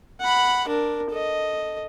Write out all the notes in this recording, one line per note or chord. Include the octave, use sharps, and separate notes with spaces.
F#5 B5
D4 A#4
A4 D#5